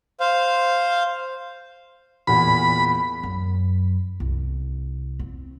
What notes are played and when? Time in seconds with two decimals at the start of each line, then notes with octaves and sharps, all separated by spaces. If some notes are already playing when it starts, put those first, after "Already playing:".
0.20 C5 F5
2.27 E2 A#2 B5
3.23 F#2
4.20 C2
5.19 C4